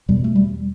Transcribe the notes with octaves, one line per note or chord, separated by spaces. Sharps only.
E2 B2 G3
A3
G3